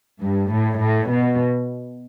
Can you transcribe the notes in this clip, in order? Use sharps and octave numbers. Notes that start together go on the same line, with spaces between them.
G2
A2
A2
B2